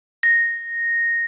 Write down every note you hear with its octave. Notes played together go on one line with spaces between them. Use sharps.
A#6